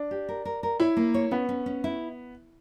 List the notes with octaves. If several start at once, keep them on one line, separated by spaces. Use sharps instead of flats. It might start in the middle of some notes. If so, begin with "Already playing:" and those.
Already playing: D4
G4
A#4
A#4
A#4
E4 C#5
A#3
C#5
B3 C#4
C#4
C#4
E4